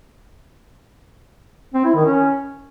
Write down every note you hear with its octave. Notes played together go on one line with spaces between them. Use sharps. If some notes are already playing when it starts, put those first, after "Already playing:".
C4
E4
D#3
C#4